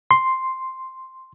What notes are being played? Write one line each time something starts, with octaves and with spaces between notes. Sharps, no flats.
C6